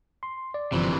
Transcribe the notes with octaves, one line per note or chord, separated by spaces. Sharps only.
C6
D5
G1 C3 E3 F3